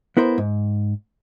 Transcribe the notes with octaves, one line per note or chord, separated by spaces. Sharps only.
B3 E4 A#4 C5
G#2